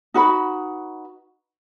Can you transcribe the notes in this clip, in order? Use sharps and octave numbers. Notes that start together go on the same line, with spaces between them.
D#4 F#4 B4 B5